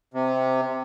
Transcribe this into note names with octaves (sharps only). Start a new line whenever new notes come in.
C3